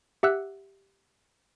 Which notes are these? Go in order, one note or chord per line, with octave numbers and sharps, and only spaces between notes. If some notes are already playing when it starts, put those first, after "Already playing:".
G4 E5 F#5 E6 F#6